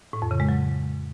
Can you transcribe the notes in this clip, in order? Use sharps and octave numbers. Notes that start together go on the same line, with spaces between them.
A2
F2
C#3
G#3
F#3